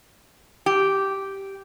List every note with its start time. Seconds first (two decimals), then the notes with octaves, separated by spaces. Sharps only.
0.66 G4